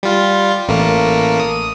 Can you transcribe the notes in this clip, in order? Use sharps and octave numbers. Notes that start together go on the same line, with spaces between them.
G3 F4
A1 A3 A#3
D#6